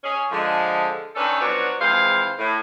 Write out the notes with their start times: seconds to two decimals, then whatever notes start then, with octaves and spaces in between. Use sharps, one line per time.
0.04 C#4 G#4
0.31 D3 F3 G#3
1.16 D#3 C#4 D4 A4 B4
1.40 F3 F#3 B3 D4 F#4 C#5
1.80 F2 E3 G#3 C5 F5
2.39 A2